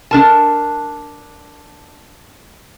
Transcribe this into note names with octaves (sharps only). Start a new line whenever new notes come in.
D4 A#4 A5